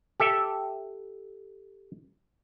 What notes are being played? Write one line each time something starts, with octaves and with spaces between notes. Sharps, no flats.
G4 A4 E5